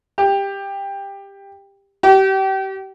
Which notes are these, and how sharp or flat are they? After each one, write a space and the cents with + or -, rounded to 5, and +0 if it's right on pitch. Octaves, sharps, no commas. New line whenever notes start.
G4 +15
G4 -30